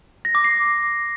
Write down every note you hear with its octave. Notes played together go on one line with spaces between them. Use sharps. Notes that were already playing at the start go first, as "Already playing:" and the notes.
A#6
D6
C7